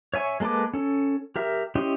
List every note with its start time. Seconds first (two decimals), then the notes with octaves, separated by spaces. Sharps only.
0.14 C#5 E5 G#5 C#6
0.40 G#3 A#3 A4 B4 D6
0.74 C#4 A4
1.36 G4 A#4 E5
1.75 C#4 E4 G4 D#5 C6